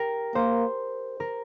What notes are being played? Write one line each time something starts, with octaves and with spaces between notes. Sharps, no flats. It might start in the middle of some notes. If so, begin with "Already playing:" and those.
Already playing: G4 A#4
A#3 C5
A#4